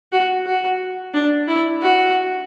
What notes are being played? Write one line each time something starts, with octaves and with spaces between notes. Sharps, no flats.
F#4
F#4
D4
E4
F#4